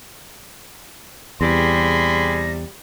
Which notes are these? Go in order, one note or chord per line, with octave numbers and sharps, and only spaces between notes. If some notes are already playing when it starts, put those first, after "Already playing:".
E2 C3 G3 G#4 B5 C6 A#6